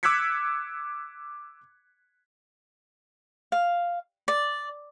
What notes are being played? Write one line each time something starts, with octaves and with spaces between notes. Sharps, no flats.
D6 E6 F#6 G#6 B6 C#7
F5
D5